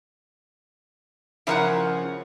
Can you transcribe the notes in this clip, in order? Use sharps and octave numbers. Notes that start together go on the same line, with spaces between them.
C#3 F3 C#4 E4 A#4 F#5